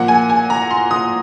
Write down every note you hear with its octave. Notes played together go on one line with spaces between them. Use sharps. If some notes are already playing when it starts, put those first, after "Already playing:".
Already playing: A#2 F3 A#3 F#5
G#5
G#5
A#5
C6
D#6